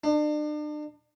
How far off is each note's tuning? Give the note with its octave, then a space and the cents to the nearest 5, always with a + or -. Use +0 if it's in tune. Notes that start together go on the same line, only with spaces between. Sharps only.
D4 +40